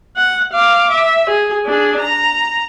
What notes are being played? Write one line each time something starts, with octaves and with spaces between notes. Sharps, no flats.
F#5
F5 D6
E5
G#4
D4 G#4
A#5